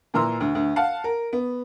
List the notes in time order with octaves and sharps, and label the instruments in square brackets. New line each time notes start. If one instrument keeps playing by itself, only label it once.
[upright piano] A#2 E3 A#5 C6 E6
D2
D2
F5 F#5 A5
A#4
B3